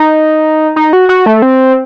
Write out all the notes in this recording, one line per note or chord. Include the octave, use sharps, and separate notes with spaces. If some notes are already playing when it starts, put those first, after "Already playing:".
Already playing: D#4
D#4
F#4
F#4
A3
C4